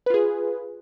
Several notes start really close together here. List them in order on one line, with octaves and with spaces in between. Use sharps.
B4 F4 G#4